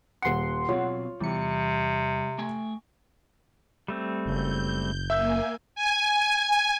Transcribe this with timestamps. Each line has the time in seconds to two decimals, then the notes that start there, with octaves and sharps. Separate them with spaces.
0.22 D#1 F#5 C6 C#7
0.69 B2 F#3 C4 F4 C#5
1.21 E2 C3 G3 C#7
2.38 A3 G5 G#5
3.88 G3 A3 C4
4.26 F#1 G6
5.10 A#3 E5 G#5 E6 G6
5.75 G#5